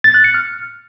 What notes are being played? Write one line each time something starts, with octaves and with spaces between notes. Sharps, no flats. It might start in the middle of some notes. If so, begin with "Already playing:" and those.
A6
F#6
C#7
F6